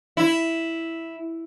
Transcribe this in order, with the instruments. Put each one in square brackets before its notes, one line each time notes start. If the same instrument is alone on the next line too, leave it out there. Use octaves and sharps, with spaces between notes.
[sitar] E4